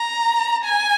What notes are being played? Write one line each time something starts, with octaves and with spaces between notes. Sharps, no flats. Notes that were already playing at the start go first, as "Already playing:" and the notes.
Already playing: A#5
G#5